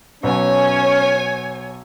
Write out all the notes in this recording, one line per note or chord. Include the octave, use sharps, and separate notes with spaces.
B1 C#4 C#5 G#5